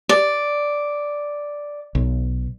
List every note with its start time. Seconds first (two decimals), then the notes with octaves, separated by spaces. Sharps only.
0.09 D5
1.95 B1